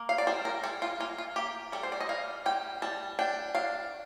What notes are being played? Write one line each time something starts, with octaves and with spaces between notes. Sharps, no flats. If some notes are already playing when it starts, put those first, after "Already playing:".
Already playing: A#3
F5
D5
G3 C5
A#4
G3 A4
F4
A#3 F4
F4
A#3 G4
G3 A4
C5
D5
D#5
G3 F5
G3 G5
G3 A5
D4 G5
D4 F5